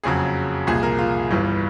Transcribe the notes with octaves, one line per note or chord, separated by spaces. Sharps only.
F#1 F2 C#3 F#3 G#4
C2 A#2 F3 G#4
A#4
F4
G1 G2 E3 G3